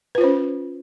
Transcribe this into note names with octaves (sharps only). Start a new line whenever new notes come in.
C#4 F4 B4 C5